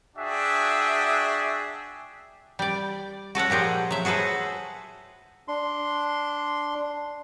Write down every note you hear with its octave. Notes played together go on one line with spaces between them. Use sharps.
D4 F#4 G#4 E5 G5
G3 D5
F#4 A4 C#5 F#5
A#2 F3 G4 G#4
F#3 E5
F#4 G#4 A4 B4 C5
D4 C6